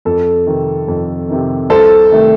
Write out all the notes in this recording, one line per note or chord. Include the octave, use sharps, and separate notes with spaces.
F2 A4
C3 D#3
F2
C3 D#3
C2 A4 C5
C3 D#3 A3